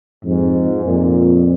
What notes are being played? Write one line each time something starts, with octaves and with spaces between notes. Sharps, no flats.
F2 G#2
F2 A#2